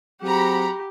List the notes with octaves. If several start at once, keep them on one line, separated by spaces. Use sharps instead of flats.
F#3 C4 G4 G#4 F#5 A#5 B5